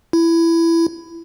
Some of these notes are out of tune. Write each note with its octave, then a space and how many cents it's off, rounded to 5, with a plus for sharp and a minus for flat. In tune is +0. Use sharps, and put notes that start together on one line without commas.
E4 +15